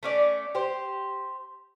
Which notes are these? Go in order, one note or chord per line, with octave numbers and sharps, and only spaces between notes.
A3 C#4 D5
G4 C5